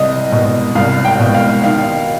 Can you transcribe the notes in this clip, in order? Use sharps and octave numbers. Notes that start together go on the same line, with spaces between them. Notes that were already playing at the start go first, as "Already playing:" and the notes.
Already playing: C2 D#5
B2
C2 F5
G5
B2
F5
D#3 F5